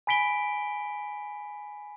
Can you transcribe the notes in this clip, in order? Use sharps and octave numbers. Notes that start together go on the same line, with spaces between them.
G#5 B5 B6 D7 G7